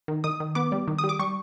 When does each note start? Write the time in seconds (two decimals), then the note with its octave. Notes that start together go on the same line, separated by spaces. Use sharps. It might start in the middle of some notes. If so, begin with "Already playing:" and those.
0.08 D#3
0.24 D#3 D#6
0.40 D#3
0.55 B3 D6
0.72 G3
0.88 D#3
0.99 D#6
1.04 G3
1.09 D6
1.19 G3 C#6